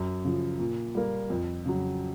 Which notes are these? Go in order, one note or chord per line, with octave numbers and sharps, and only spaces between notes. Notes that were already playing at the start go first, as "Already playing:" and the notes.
Already playing: F#2
C#3 F3
A#2
G3 A#3
F2
C#3 F#3